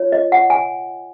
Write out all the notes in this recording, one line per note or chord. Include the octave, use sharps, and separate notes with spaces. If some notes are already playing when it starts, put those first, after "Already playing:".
Already playing: F4 C#5
D#5
F#5
G#5